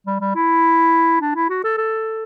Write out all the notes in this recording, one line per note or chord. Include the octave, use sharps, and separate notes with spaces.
G3
G3
E4
D4
E4
F#4
A4
A4